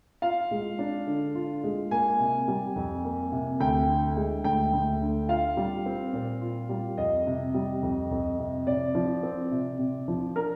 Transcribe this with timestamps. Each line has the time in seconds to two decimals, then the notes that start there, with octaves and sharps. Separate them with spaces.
0.22 F4 F5
0.51 G#3
0.79 D4
1.07 D3
1.35 F4
1.64 G#3
1.91 A#3 G#5
2.19 C3
2.48 G3
2.76 F2
3.04 A#3
3.32 C3
3.60 D2 G5
3.88 D3
4.17 G#3
4.44 D2 G5
4.73 D2
5.01 D3
5.29 F4 F5
5.57 G3
5.86 C4
6.13 A#2
6.41 F4
6.69 G3
6.98 F2 D#5
7.27 C3
7.54 G3
7.83 F2
8.11 F2
8.39 C3
8.67 C3 D5
8.95 F3
9.23 C4
9.51 C3
9.79 C3
10.08 F3
10.35 D4 A#4